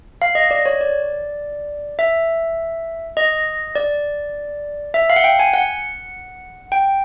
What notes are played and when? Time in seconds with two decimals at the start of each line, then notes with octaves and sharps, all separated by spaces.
0.22 F5
0.35 D#5
0.51 D5
0.66 C#5
0.81 D5
1.99 E5
3.17 D#5
3.75 D5
4.94 E5
5.10 F5
5.16 F#5
5.24 G5
5.39 G#5
5.54 F#5
6.72 G5